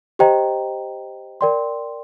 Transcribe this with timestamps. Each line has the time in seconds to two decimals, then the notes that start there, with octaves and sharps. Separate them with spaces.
0.19 G4 C5 D#5 G5 A#5
1.41 A#4 D5 G5 C6